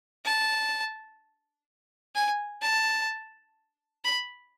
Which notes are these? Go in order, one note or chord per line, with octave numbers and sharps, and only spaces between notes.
A5
G#5
A5
B5